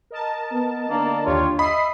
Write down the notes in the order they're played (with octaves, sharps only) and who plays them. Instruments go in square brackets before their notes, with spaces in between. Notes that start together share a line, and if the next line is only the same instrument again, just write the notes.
[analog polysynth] A#4 D#5 A5
[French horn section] B3
[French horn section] D3 D4 [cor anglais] A#3
[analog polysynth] D#2 G4 C#5 [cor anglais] F4
[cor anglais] D#5 [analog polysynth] E5 D#6 C7 [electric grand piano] B5